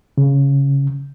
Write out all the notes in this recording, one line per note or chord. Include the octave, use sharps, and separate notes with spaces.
C#3